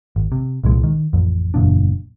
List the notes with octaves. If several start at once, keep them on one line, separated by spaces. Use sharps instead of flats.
G#1
C3
C2 A#2 E3 G#3
D#3
A1 F2
F#1 E2 A#2 D4